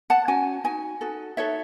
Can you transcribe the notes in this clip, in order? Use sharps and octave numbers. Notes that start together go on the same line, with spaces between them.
F#5 A5
C#4 F#4 G#5
D#4 F#4 G#5
D#4 F#4 A4
D#4 F#4 A4 C#5 E5